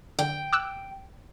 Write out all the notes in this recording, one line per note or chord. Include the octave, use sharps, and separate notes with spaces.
D3 G5
D6 E6 F#6